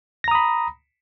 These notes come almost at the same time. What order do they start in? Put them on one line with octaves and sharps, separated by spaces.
A#6 A#5 D#6 B5